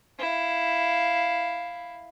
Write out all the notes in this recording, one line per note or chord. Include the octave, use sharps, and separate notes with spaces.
E4 F5